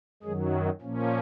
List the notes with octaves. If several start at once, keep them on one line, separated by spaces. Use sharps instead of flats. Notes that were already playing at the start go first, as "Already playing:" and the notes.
F#2 D#3 F#3 G#3 G#4
A#2 F3 A#3 C#4